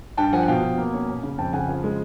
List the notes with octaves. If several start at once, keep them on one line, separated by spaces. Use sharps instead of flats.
G2 G5 A5
F3 F#5 G#5
F#5
B2 F5 G5
B2
A#3
C#4
C#4
C#3
F2 G5 A5
C#3 F#5 G#5
F3
G#3